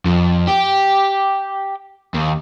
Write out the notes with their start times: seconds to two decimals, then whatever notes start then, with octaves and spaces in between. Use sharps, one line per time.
0.05 F2
0.48 G4
2.14 D#2